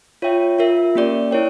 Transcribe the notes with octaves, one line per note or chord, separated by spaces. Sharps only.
F4 C#5 E5 G5
F4 A#4 E5
A#3 C#4 G4 D5
E4 A#4 C#5 G5